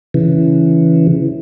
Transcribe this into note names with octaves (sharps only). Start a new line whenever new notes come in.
C#3 E3